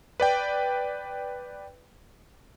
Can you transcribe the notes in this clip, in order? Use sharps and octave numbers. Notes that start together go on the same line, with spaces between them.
B4 D5 G5